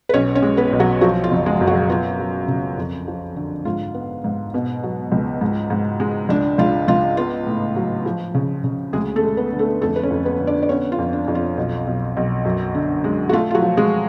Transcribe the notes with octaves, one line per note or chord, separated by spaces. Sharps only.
B4
B1 C#4 C#5
C#4 C#5
G#3
B3 B4
B1
F#3 F#4
F3 F#3 F#4
F4
F#1
G#3 G#4
F#2
F#3 F#4
B3 F4
F#3
C#3
F2
F3
D3
G#2 F4
B3
G#2
B2
F#3
C#2
G#2
G#2
G#3
C#2 D4
C#2 F4
C#2 F4
B3 F4
A2
F#3
F3
C#3
C#3
D2 G#3 G#4
A3 A4
G#3
B3 B4
D3
A3 A4
F2 A3 A4
B4
C#4 C#5
F2
B3 B4
D3
D4 D5
D5
B3 C#4 C#5
F4
F2
D4
F2
F4
B1
B1
B1
F#2
D3
G#3
F#4
A3 F4
F4
F#3 F#4
F3
G#3 G#4